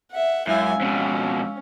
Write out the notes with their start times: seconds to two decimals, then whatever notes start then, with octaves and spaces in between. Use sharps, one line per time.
0.11 E5 F#5
0.47 F#2 G#3 E4 F5 G#5 E6
0.81 F2 B2 C#4